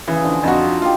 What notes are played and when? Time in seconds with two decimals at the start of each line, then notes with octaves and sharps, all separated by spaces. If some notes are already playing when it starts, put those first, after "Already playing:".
0.08 C#3 E3
0.24 D3 F3
0.44 F2 D#4 F4 F#4 A4
0.82 A#3 F4 G4